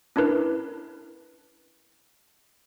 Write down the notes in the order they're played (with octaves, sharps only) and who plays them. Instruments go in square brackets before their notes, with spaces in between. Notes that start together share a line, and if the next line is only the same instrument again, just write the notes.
[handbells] C#4 D4 E4 A#4 B4